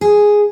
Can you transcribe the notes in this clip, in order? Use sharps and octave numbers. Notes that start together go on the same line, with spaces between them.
G#4